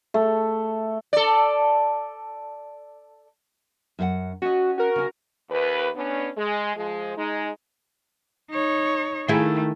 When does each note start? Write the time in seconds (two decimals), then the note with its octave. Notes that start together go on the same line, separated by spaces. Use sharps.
0.14 A3
1.13 A4 D5
3.99 F#2 F#4 F#5
4.42 C#4 F#4 D#5
4.78 F#4 A#4
4.96 C#3 C#4
5.50 D#2 B4
5.96 B3 C#4 D4
6.37 G#3
6.76 F3 G#3
7.18 G#3 D#4
8.51 D#4 C#5
9.28 D#3 A3 E4 G#4